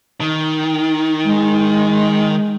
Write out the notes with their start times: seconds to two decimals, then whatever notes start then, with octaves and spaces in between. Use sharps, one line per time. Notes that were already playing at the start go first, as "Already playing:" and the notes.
0.21 D#3
1.24 G#3